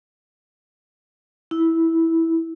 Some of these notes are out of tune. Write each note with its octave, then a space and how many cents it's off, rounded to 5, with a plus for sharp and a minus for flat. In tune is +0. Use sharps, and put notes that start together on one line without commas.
E4 -10